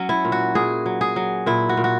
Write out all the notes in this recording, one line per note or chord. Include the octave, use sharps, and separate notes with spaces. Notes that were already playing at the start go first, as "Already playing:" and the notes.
Already playing: F#3 C#4
E4
A#2
F#4
A#2 G#4
F#3
G#4
F#3
A#2 E4
F#4
A#2
F#4